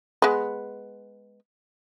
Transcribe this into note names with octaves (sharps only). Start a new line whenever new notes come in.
G#3 B3